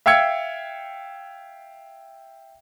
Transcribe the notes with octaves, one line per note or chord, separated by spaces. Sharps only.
E5 F5 G5 E6 G#6 C#7